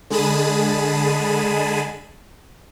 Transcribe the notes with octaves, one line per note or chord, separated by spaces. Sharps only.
D3 G#3 G#4 A5 B5 D#7